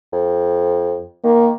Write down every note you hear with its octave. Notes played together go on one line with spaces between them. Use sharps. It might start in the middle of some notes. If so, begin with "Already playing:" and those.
F2
D#3 A#3